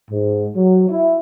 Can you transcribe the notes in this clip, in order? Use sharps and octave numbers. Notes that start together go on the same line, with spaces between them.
G#2
F#3
E4